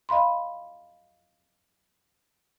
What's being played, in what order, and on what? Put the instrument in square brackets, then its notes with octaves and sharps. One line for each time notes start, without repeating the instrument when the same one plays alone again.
[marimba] D#5 F5 B5 C6